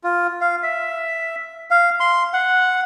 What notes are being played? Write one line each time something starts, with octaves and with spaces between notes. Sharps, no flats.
F4
F5
E5
F5
C6
F#5